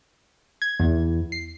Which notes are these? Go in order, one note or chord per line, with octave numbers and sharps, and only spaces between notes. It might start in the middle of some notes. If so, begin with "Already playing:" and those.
G#6
E2
C7